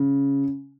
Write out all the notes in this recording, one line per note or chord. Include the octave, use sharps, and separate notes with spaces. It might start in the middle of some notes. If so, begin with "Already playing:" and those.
Already playing: C#3